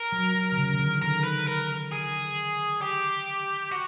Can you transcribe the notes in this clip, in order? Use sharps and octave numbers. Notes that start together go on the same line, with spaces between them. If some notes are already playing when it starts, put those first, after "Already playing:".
Already playing: A#4
F#3
F#3
D3
C#3
D#3
D3
D#3 A#4
B4
A#4
G#4
G4
F#4